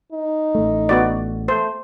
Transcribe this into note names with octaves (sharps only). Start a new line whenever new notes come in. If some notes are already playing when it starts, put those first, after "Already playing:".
D#4
A1 A3
B3 F#4 D5
A3 C5